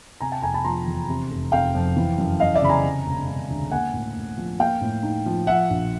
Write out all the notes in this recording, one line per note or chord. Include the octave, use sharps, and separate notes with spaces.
C3 G#5 A#5
G5 A5
F1 G#5 A#5
A5 B5
F3 A#5 C6
E2
C3
F1
F1 F5 G5
F2
E3
F#2
F#2 D#5 F5
D5 E5
C#3 B5
G#5 A#5
C3
E1
E1
D2
A#3 F#5 G#5
A2
A2
F3
A#3 F5 G5
A2
D#4
F3
F3 E5 F#5
A#1